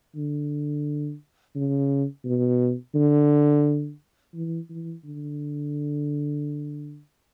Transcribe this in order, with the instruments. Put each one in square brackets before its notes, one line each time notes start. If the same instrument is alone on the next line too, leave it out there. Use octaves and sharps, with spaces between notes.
[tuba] D3
C#3
B2
D3
E3
E3
D3